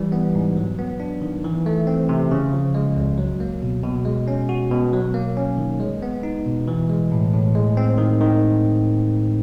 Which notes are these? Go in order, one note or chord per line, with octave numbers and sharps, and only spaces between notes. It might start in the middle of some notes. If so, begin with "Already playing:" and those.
Already playing: E3 G3
B3
G#2
F#3
B3
D4
D#3
E3
A3
C4
C3
C#3
F3
G#3
C#2
F#3
A#3
B2
B2
G#3
C#4
F#4
B2
F#3
A#3
C#4
D#3
G#3
B3
D#4
B2
E3
G#3
A2
A2
G#3
C4
D#3
D#3